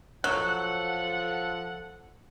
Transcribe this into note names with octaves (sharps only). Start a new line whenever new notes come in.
F3 F#3 A4 F#5 F#6